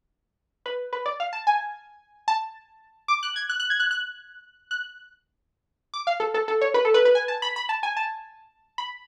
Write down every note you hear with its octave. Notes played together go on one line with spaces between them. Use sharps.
B4
B4
D5
F5
A5
G#5
A5
D6
F#6
G#6
F#6
F#6
G#6
F#6
F#6
F#6
D6
F5
A4
A4
A4
C#5
B4
A4
B4
B4
G#5
A5
B5
B5
A5
G#5
A5
B5